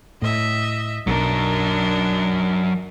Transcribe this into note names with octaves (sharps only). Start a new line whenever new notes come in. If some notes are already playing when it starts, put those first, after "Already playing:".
A2 D#5 E5
B1 F#3 D4 D#4 A#4